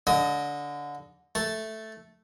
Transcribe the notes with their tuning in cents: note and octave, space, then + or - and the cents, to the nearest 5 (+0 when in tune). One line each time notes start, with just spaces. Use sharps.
D3 -15 D#5 +0 D#6 +45
A3 +0 A5 +0